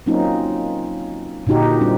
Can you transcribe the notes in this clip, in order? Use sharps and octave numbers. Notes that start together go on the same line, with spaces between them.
F#3 A#3 C4 C#4 D#4 F4
A#2 D3 D#4 F#4 G4
G3 C4 D4